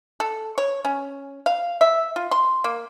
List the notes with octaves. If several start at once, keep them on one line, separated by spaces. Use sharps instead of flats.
A4
C#5
C#4
F5
E5
F4
C6
A#3